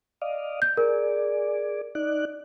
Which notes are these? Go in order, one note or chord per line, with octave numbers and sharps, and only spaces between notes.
D5 D#5 F5
G6
G#4 A#4 D5
D#4 D5 F#6